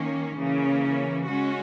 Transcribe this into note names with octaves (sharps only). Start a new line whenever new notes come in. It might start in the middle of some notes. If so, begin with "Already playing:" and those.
Already playing: D#3 A#3 C#4
C#3 E3 A#3 C#4
G#3 C#4 F#4